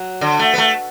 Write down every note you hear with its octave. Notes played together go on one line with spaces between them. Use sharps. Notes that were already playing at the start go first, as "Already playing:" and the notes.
Already playing: F#3
D3
A3
B3
A3